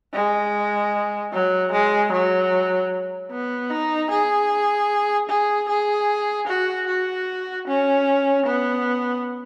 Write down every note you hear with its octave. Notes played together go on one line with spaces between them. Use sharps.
G#3
F#3
G#3
F#3
B3
D#4
G#4
G#4
G#4
F#4
F#4
C#4
B3